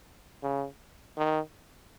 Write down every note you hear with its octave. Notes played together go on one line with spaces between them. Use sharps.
C#3
D#3